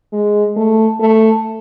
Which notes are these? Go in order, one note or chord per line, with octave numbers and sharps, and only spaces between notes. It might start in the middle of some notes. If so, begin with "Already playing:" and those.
G#3
A3
A3